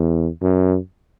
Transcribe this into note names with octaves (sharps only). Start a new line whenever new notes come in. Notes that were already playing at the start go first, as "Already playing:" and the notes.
Already playing: E2
F#2